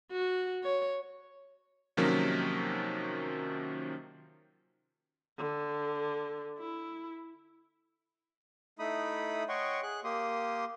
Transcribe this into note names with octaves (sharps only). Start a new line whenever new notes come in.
F#4
C#5
C3 D#3 F3 F#3 A#3 C#4
D3
E4
A3 D#4 E4 B5 D#6
C#5 D#5 F#5 G5 C6 C#6
G#4 F#6
A#3 G4 C6 D#6